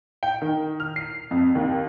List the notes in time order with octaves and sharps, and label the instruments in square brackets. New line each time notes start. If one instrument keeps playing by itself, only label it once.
[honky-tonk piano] G5
D#3
F6
C7
F2
D#2